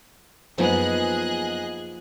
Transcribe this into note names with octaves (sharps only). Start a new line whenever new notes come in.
F#2 F3 A#3 B3 D#4 G#4 D#5 F#6